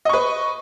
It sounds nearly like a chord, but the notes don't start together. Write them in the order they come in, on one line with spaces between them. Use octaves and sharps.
D#5 C#6 B4